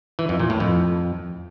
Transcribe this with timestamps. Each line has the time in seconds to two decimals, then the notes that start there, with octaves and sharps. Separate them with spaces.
0.19 E3
0.29 F2
0.39 A#2
0.50 A2
0.60 F2